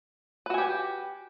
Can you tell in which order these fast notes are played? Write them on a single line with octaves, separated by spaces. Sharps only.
B4 F#4 G#5 G4